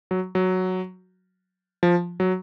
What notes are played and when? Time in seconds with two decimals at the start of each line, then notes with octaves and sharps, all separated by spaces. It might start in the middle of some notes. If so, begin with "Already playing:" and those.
0.11 F#3
0.35 F#3
1.83 F3
2.20 F#3